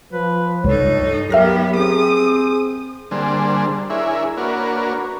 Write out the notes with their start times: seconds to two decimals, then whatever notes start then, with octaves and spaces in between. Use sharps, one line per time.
0.13 F3 B4
0.64 C#2 G2 D#4 A4 C#5
1.30 F#3 B3 G4 A#4 E5 F6 A#6
1.76 C4 G#4 D#6
3.11 D3 G3 A#3 D4 G#4 C5
3.90 D4 E4 G#4 A#4 C#5 E5
4.37 A#3 D4 F#4 A#4 B4 C#5